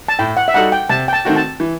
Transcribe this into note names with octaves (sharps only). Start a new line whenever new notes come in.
A5
A2 G5
F#5
E5
G3 D#4 F#4 A4 F#5
G5
C3 A5
G5
A5
D#3 A3 C4 F#4
A5
E3